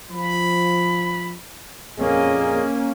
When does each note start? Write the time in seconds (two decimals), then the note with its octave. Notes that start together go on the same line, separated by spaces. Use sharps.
0.11 F3 B5
1.98 F2 A#2 A#3 C#4 G#4 D#5